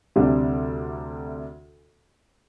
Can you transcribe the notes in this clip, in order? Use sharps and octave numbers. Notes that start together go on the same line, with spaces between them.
D2 C3 G3 D4